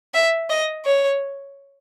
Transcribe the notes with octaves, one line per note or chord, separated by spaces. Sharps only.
E5
D#5
C#5